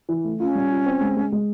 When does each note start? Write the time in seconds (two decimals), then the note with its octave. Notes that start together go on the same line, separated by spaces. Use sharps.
0.09 E3
0.24 A3
0.40 C#4 F4
0.55 G3
0.71 F4
0.86 C4
1.01 G#3
1.16 G#3
1.32 G#3